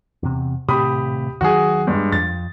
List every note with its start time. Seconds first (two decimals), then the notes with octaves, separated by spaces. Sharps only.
0.23 E2 C3
0.68 D#1 A2 C3 G4 B5 D#6
1.41 D#2 D#3 F#3 F#4 G#4
1.87 G2 G#3
2.12 F2 A6